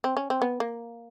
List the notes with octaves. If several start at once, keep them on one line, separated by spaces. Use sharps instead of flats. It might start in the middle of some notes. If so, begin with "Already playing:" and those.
C4
C#4
C4
B3
A#3